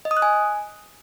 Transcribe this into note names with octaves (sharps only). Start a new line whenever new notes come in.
D#5
D#6
F#6
G#5